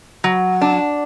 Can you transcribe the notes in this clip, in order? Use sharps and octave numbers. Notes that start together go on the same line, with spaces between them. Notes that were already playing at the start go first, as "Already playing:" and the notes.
F#3
D4